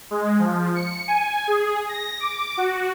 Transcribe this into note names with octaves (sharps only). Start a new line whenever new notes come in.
G#3
F3
C#7
G#5
G#4
A#6
D6
F#4